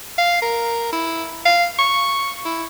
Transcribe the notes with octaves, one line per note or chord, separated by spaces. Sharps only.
F5
A#4
E4
F5
C#6
E4